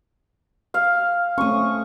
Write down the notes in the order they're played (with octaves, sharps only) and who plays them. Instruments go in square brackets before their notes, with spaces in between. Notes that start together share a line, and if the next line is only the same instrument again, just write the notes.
[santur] F5
[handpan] A3 C4 C#4 [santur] C#6 D#6